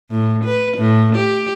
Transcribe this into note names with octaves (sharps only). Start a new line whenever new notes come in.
A2
B4
A2
G4